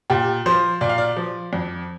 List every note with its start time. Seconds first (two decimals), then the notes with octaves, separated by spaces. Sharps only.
0.10 A#2 G4
0.46 F3 C5
0.81 A#2 D5
0.89 F5
0.98 D5
1.17 F3
1.53 F2